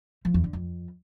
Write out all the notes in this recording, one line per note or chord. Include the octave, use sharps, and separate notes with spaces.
F3
E2
D3
F2